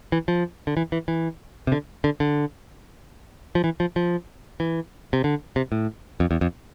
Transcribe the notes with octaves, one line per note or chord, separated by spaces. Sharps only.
E3
F3
D3
E3
E3
E3
C3
D3
D3
D3
F3
E3
F3
F3
E3
C3
D3
C3
A2
F2
E2
F2